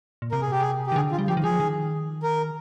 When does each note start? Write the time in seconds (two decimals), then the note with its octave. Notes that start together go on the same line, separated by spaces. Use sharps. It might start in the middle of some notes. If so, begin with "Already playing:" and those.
0.22 A#2
0.32 C3 A#4
0.42 G#4
0.52 G4
0.60 G#4
0.87 G4
0.92 D#3
0.96 D3 G#4
1.11 F4
1.18 G3
1.28 F3 G4
1.37 D#3
1.43 F3 G#4
1.60 D#3
2.23 A#4